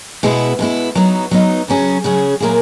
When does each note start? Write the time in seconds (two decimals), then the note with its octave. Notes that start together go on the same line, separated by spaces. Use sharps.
0.23 B2 G#3 B3 E4
0.59 B2 G#3 B3 E4
0.95 F#3 B3 D#4
1.31 F#3 B3 D#4
1.68 C#3 F#3 C#4 G#4
2.04 C#3 F#3 C#4 G#4
2.40 A#2 F#3 A#3 E4 G#4